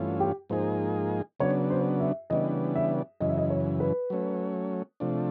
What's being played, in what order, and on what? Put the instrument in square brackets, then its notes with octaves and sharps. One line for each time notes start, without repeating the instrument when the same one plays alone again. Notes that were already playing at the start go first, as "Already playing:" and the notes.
Already playing: [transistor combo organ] G2 E3 A3 C#4 F4
[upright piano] G4
[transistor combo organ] G#2 F3 A#3 D#4 G#4 [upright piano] C5
[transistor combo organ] C#3 F#3 B3 D4 [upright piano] C#5
[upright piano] C5
E5
[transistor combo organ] C#3 E3 G3 B3 D4 [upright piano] D#5
[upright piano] E5
[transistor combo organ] F#2 C#3 E3 [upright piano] D#5
[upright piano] E5
D#5
C#5
B4
[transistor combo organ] F#3 A3 C#4
C3 F3 A3 D4